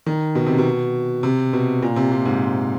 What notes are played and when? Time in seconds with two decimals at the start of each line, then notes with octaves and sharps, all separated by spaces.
0.06 D#3
0.35 B2
0.47 C3
0.58 B2
1.23 C3
1.53 B2
1.82 A#2
1.96 C3
2.12 A#2
2.25 G#2